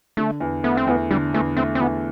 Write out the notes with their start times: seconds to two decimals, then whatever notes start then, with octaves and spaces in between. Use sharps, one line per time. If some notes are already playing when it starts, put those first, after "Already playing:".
0.17 D3 A3
0.40 E2
0.64 A3 B3
0.77 C4
0.87 E2 B3
1.11 D3 G3
1.34 E2 A3
1.57 A3 C4
1.75 C4
1.81 E2 B3